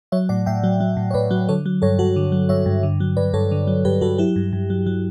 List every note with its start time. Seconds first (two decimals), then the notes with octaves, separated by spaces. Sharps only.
0.12 F#3 C#5 E5
0.29 A2 D5 F#5
0.46 A2 E5 G5
0.64 F#3
0.80 F#3
0.97 A2
1.11 C#5
1.14 A2 B4 D5
1.31 F#3
1.49 D3 A4 C#5
1.66 F#3
1.82 G2 A4 C#5
1.99 G2 F#4 A4
2.16 D3
2.32 F#3
2.49 G2 C#5 E5
2.66 G2
2.83 D3
3.00 F#3
3.17 G2 B4 D5
3.34 G2 A4 C#5
3.51 D3
3.67 F#3
3.85 G2 G4 B4
4.01 G2 F#4 A4
4.18 F#3 E4 G4
4.36 G2
4.53 G2
4.70 F#3
4.86 F#3